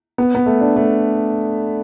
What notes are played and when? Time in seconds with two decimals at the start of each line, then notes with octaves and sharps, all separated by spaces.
0.18 B3
0.35 B3
0.46 A3
0.61 D4
0.76 A3